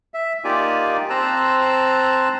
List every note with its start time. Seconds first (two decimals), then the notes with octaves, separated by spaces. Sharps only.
0.14 E5
0.44 A#3 D#4 F4 G4 D5 G#5
1.10 C4 C5 A5 A#5 E6 F#6